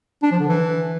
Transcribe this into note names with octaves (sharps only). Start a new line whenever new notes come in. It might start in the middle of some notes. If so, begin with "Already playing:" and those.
D4
F3
D3
E3